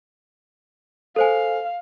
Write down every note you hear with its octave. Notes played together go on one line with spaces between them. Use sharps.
A4 C5 F5 G#5